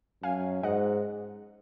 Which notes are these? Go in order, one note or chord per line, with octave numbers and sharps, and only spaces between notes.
F#2 F5 G#5
G#2 D#5 F#5